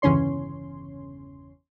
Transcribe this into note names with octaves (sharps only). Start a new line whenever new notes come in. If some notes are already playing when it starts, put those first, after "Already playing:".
G1 E2 C#3 C#4 C#5 C6